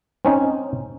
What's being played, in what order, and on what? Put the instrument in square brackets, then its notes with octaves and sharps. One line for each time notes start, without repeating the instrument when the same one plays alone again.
[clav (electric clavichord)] C4 C#4 D#4